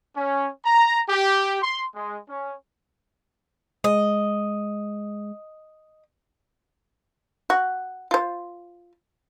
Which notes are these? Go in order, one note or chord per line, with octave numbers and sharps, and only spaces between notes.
C#4
A#5
G4
C6
G#3
C#4
G#3 D#5
F#4
F4 C5